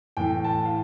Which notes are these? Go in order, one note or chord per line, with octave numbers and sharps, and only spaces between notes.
A2 E3 G5
A5
F5